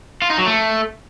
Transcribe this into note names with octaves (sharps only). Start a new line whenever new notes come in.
F4
D#4
F#3
A3